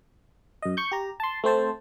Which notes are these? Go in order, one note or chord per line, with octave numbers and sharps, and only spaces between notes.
F#2 D#5
C#6 G6
G4 A#5
A5 C6
A3 C4 C5 A5